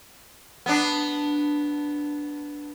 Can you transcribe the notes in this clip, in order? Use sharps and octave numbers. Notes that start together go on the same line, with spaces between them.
B3 D4